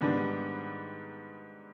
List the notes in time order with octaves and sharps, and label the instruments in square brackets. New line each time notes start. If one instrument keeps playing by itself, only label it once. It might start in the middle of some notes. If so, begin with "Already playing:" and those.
[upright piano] G#2 D#3 G3 B3 D4